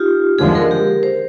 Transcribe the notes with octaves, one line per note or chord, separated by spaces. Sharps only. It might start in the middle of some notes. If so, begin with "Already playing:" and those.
Already playing: D#4 F4 G4
D#2 D3 F3 G#3 G#4
A#4
G4
C5